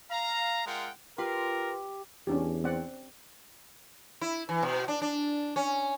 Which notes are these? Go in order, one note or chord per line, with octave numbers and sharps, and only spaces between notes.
F5 A#5
G#3 F4 A#4 F#5 G5
F4 G4 A#4 B4 C6
E2 C#4 D4 G4
C4 D5 F#5
E4
E3
B2
D4
D4
C#4